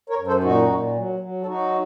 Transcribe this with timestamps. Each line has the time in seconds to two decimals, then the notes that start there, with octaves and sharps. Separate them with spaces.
0.09 A#4 C#5
0.18 F#2
0.27 A4 C5
0.43 A#2 D#4 F#4
0.69 A#2
0.96 F#3
1.20 F#3
1.42 A4
1.46 F#3 D#4 F#4